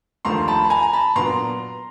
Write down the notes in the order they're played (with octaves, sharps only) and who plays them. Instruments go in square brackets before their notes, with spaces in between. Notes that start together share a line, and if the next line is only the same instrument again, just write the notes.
[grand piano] D#2 D3 F3 A3 A#5 C6
A5 B5
B5
G#5 A#5
A#5
A5 B5
A#2 F#3 B3 D4 A#5 C6